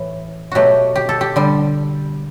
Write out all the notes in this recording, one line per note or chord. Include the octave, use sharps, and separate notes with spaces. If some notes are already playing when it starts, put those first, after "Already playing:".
Already playing: A2 E3
B2 F#3 A3 F#4 G4
G4
A4
G4
D3 G3